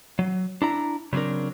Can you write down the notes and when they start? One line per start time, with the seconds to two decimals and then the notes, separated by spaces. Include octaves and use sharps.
0.19 F#3
0.62 D4 E4 A#5
1.13 C#3 F#3 C4 D4 A#4